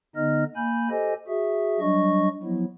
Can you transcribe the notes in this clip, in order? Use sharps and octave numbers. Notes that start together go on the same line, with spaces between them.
D3 B3 D#4 D#5 F6
A#3 G#5 B5 G6
G4 A4 C5 D#5 G#5
F#4 G#4 E5
F#3 G3 D4 D#5 C#6
F3 F#3 B3 E4